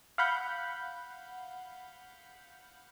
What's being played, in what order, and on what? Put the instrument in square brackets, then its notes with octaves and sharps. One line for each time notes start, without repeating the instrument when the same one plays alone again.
[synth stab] F5 F#5 B5 G6